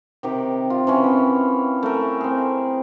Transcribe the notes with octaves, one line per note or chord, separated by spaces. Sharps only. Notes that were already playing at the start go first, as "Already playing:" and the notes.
C3 D#3 G4
F4
C3 E3 C#4
B3
A3 A#4
C4 G#4